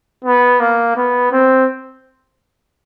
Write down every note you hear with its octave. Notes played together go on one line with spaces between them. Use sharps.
B3
A#3
B3
C4